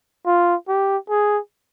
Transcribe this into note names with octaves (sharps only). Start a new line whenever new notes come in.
F4
G4
G#4